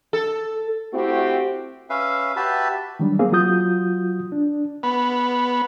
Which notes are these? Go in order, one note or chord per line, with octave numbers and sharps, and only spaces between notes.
A4
A3 C4 E4 F#4 G4
C#4 B4 E5 F5
F#4 G4 B4 E5 A5 B5
D#3 F#3 G3 D4
A#3 C4 G#4 F5
F#3 F4 F#4 D#6 G6
D4
B3